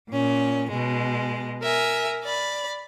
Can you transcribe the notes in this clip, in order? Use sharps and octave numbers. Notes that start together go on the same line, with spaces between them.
A#2 C#4
B2 G#3
A#4 E5 G#5
D5 B5